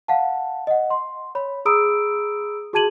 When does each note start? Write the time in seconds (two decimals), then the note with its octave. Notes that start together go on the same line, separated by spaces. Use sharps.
0.08 F5 F#5 A5
0.67 D#5 F#5
0.90 C6
1.35 C#5 B5
1.65 G#4 A#5 B5 D#6 E6 D7
2.73 F#4 G#4 A5 G#6 D#7 F#7